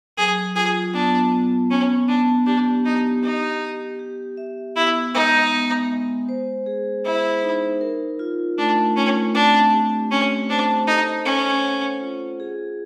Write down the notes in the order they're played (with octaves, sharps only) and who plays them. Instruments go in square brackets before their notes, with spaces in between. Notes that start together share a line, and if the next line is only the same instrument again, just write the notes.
[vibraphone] F#3 [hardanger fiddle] G#4
[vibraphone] F4 [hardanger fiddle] G#4
[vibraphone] B3 [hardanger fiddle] D4
[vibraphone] B3
[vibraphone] B3 [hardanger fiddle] C#4
[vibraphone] B3 [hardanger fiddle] D4
[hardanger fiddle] D4 [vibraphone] G4
[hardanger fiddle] D#4 [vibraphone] G4
[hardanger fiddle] D#4 [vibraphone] G4
[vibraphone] G4
G4
E5
[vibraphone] B3 [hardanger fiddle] E4
[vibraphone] G#3 [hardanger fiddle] D#4
[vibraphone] B3
G#3
C5
G#4
[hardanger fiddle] E4 [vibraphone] C5
[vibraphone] D#4
A#4
F4
[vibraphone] A3 [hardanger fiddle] D4
[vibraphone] A3 [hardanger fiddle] C#4
[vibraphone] C4 [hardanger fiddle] D4
[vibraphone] G4
[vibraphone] C4 [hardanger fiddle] C#4
[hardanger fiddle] D4 [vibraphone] C5
[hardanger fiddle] D#4 [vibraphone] A4
[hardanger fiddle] C#4 [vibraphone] A4
[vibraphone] F#5
F4
G#4